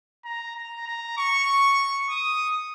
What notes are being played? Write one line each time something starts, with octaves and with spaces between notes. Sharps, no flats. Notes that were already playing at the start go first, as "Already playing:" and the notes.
A#5
A#5
A#5
C#6
D#6